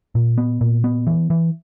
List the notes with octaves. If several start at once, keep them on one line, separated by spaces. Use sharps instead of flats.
A#2
B3
A#2
B3
E3
E3